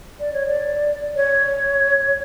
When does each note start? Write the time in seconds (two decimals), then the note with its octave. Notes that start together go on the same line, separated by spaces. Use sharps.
0.20 D5
0.34 C#5
0.47 D5
1.16 C#5